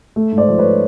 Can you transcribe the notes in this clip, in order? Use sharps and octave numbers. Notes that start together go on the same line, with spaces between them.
A3
G#2
C5 D5
F3 C5
B4 C#5